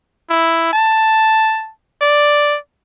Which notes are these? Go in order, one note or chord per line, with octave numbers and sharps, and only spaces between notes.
E4
A5
D5